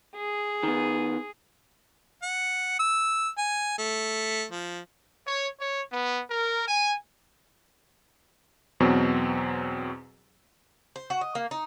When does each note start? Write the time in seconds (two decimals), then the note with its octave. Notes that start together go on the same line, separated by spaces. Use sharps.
0.15 G#4
0.63 D#3 B3
2.23 F#5
2.79 E6
3.38 G#5
3.78 A3
4.52 F3
5.27 C#5
5.60 C#5
5.92 B3
6.31 A#4
6.68 G#5
8.80 E2 B2 F#3 C4
10.96 C5
11.10 F#4
11.21 D#5
11.35 A#3
11.51 D#4